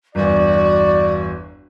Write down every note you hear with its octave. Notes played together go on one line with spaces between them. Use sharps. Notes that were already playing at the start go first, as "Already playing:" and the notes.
G1 E2 F#4 D5